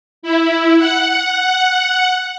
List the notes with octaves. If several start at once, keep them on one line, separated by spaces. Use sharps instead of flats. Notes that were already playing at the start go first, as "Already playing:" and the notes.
E4
F#5